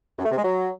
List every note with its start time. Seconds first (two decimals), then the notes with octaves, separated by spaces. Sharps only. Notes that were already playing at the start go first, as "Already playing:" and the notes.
0.19 F#2
0.25 A3
0.31 C3
0.37 G#3
0.44 F#3